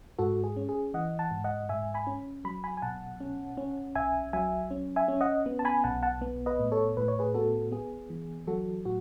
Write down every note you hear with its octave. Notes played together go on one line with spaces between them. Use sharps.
G#2 F#4 A4
G#4
C#4
G#4
E3 D#5 F#5
F#5 A5
G#2
D#5 F#5
G#2 E5 G#5
G#5 B5
C#4
F#3 B5
G#5 B5
G#5
B2 F#5 A5
C#4
C#4
B1 E5 G#5
F#3 E5 G#5
C#4
E5 G#5
C#4
D#5 F#5
B3
A5
G#5 B5
B1 F#5 A5
F#5 A5
B3
B4 D#5
A2
A4 C#5
A2 B4
C#5
G#4 B4
B3 F#4 A4
B3 G#4
E3
F#3 F#4 A4
A2 F#4